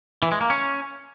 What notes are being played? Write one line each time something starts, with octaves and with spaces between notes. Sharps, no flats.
E3
G#3
A#3
C#4